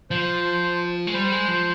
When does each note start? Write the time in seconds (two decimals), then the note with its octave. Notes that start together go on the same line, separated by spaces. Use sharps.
0.11 F3 C5
1.07 G#3
1.14 G3 C5
1.32 G#3
1.48 F3